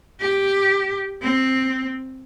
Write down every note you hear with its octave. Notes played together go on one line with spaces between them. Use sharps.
G4
C4